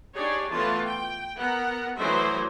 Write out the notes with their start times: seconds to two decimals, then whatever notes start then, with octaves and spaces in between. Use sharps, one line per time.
0.17 D4 D#4 G4 G#4 C#5 D5
0.52 E3 A3 B3 F4 A5
0.85 G5
1.37 B3 A#4 F#5 A#5
1.96 E3 F#3 A3 C5 D#5 E5